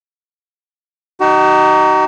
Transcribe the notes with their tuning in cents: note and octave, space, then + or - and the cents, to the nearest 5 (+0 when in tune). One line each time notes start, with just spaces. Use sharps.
D#4 -15 F#4 +40